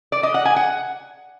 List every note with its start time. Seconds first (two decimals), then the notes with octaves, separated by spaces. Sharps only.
0.12 D5
0.23 D#5
0.34 F#5
0.45 G#5
0.56 F#5